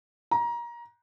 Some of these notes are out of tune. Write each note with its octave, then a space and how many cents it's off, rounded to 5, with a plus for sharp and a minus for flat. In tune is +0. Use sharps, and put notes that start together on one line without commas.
A#5 +25